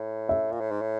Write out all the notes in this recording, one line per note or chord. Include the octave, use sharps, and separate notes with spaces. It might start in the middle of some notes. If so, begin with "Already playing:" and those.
Already playing: A2
E5
A#2
A2
G#2
A2